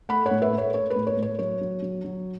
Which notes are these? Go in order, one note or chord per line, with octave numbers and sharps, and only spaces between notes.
A3 F#5 B5
C#5 F#5
A2
B4 E5
A3
C#5
A3 C#5
B4
A2
C#5
A2
C#5
F#3 C#5
F#3
F#3
F#3